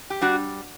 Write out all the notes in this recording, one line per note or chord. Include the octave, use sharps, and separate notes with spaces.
G4
G3 D4 F#4